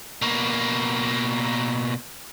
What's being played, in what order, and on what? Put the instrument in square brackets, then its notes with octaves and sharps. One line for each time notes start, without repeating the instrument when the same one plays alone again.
[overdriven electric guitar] B2 A#3